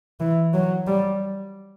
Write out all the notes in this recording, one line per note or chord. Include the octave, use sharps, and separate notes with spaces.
E3
F#3
G3